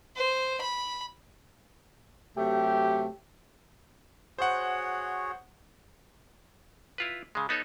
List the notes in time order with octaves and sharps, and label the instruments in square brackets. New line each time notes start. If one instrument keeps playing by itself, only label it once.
[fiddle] C5
B5
[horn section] C3 F#3 A3 [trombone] G4
[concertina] F#4 G#4 C#5 [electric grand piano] C5 F#5
[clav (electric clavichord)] E4 F4 B4
C#3 G#3
B3 D#4 A4 C#5